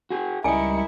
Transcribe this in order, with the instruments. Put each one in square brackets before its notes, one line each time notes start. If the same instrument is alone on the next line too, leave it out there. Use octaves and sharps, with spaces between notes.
[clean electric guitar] F#4 G#4
[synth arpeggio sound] C#2 G3 C#7 [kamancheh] E4 [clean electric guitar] A#4 D#5 [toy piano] G#5